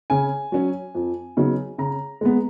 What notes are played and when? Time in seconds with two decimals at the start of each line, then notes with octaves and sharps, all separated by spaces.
0.10 C#3 G#5
0.52 F#3 C#4
0.95 F2
1.37 C#3 F#3 B3 D#4
1.78 C#3 A#5
2.21 G#3 B3